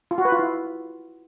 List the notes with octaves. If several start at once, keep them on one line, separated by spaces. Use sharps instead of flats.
F4
F#4
B4
F4
E4